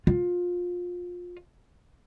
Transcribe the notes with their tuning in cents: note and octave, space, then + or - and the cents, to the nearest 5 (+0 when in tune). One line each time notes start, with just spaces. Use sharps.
F4 +25